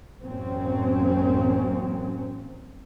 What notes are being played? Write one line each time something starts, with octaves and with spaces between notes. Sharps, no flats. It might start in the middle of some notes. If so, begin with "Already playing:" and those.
A1 F#2 F#3 A#3 C4 C#4